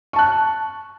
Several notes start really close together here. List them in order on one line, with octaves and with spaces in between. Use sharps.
C#6 A5 F#6